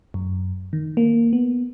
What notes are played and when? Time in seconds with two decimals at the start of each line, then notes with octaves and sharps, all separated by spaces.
0.14 F#2
0.73 D#3
0.97 A#3
1.33 B3